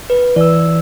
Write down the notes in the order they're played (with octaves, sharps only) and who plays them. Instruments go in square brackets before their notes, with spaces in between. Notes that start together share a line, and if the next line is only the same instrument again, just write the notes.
[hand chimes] B4
[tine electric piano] E3 [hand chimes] D5 E6